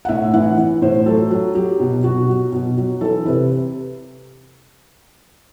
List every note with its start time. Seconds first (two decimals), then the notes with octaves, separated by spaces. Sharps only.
0.05 F#5
0.09 A2 E5
0.34 E3 F#5
0.58 E3
0.82 A2 C5
1.06 F#3 A4
1.31 F#3
1.55 F#3 G4
1.80 B2
2.04 B2 F#4
2.28 F#3
2.52 B2
2.77 F#3
3.01 E3 A4
3.26 C3 B4